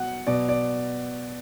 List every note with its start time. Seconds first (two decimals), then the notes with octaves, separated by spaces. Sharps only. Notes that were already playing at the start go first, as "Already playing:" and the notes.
Already playing: B2 F#3 F#5
0.27 B2 F#3 D5
0.49 D5